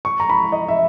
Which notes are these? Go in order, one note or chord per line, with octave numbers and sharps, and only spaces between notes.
C#6
A#5
B5
D#5
E5